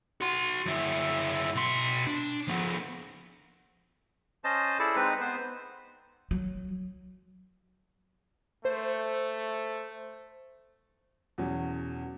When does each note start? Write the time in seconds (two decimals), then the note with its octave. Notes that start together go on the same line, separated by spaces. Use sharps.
0.21 F#4 C6
0.66 F#2 E4
1.55 B2 C6
2.07 D4
2.48 F3 B3
4.44 C#4 C5 D#5 A5
4.79 E4 G#4 A4 D5 A5
4.96 G#3 C4 D#4 B4
5.21 B3 C5
6.31 F#3
8.65 A3 C5
11.38 E2 B2 F#3 C#4